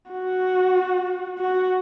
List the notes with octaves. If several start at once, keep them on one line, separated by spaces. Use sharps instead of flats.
F#4
F#4